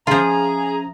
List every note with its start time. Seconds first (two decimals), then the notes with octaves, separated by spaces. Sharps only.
0.07 F3 C#4 F4 G#4 E5 A#5